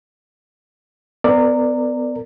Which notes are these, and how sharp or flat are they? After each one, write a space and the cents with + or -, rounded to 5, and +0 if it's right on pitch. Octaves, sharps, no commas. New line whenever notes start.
B3 +30 A#4 -20 D5 +10